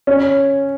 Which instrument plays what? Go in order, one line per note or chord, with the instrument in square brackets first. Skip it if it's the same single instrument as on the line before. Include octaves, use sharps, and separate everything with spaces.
[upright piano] C#4